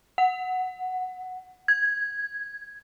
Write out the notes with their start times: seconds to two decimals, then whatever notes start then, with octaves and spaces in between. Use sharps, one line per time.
0.18 F#5
1.68 G#6